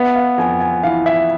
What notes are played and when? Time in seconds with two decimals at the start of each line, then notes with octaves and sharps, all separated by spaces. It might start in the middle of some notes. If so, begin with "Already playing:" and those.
Already playing: B3 E5
0.15 F5
0.38 F2 G#5
0.60 G#5
0.83 E3 F5
1.06 E5